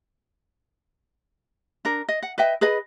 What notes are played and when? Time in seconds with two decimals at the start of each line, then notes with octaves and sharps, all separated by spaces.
1.85 D4 A#4
2.09 D#5
2.23 F#5
2.38 B4 D#5 E5 G5
2.61 G#4 B4 D#5 B5